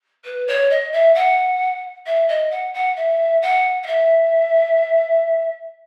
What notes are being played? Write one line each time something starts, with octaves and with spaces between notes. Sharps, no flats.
B4
C#5
D#5
E5
F#5
E5
D#5
F#5
F#5
E5
F#5
F#5
E5